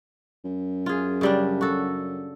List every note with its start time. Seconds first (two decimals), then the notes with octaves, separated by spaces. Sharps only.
0.44 F#2
0.86 F4 G#4
1.21 C#3 G3 D4
1.61 F#4 A4